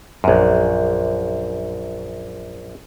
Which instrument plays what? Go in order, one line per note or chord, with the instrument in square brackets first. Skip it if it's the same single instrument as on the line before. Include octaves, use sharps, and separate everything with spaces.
[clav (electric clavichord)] A#1 F#2